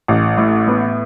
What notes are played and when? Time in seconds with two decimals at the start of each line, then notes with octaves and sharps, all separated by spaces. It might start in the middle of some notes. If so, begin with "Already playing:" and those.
0.08 A1
0.37 A2
0.68 B3